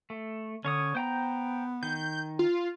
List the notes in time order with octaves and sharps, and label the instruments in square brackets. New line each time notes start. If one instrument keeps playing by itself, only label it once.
[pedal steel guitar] A3
[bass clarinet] D3 [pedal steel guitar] C#4 C#5 D#6
[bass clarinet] B3 [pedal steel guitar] C5 G5 A#5
[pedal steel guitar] D#3 [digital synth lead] G6
[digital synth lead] F4